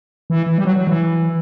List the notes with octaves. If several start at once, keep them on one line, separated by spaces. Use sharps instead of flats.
E3
E3
G3
F#3
F#3
E3